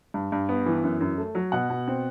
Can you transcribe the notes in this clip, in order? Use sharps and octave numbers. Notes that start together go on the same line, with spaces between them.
G2
G2
B3
E3
F#2
F#2
A3
F#3
B2 F#5
B2
C4